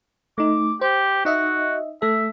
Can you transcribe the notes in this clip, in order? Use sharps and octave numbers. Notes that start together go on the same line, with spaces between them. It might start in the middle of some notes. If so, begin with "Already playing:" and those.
A3 D#4 D6
G4 C5
D#4 F#4 D#5 E5
A3 A4 E5